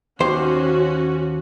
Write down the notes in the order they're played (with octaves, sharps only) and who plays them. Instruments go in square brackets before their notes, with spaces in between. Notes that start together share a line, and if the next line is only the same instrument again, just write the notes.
[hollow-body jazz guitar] D#2 C5 [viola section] C#4 F#4